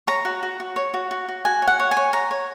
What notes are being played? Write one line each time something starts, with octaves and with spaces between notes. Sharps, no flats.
C#5 A#5
F#4
F#4
F#4
C#5
F#4
F#4
F#4
F#4 G#5
C#5
F#5
C#5
G#5
C#5
C#5 A#5
C#5